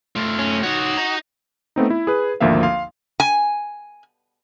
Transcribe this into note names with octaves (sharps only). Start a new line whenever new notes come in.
A3 F4
C#4
D#4 F#4 C#5
D#5 A#5
A3 B3 C4 D#4
E4
G#4 B4
G#1 D2 F3 A#3 E5 F5
F5 C6
G#5